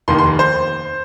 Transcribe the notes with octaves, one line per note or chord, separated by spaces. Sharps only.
F1 D#2 D#3 C6
C6
C5